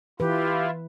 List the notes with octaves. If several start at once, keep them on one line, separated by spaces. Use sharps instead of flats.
E3 E4 F4 G4 B4